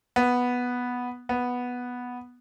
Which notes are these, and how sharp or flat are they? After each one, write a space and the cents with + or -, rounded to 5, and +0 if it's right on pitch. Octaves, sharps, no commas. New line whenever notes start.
B3 -5
B3 -5